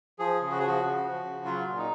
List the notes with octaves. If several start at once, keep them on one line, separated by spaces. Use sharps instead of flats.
F3 G#4
C#3
F#4
F3 G#4
F#4
C#3
F3
C#3
F#3 F4
A#2
D#4